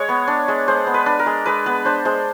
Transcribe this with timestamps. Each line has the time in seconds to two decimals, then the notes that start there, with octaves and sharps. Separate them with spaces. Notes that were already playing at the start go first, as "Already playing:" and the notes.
Already playing: G#3 C#5
0.09 B3
0.28 D4
0.48 G#3
0.68 G#3 C5
0.87 B3
0.94 B4
1.06 D4
1.19 A#4
1.26 G#3
1.46 G#3 B4
1.66 B3 B4
1.85 D4 C5
2.05 G#3 C5